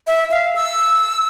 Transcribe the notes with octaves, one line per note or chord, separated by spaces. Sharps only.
E5
F5
E6